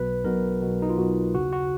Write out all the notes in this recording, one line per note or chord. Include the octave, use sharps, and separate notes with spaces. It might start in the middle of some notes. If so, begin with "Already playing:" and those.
Already playing: B1 B2 B4
B1 B2 A#4
B1 B2
D#4
F4
B1 B2 F#4
D#2 C#3 F#4
F#4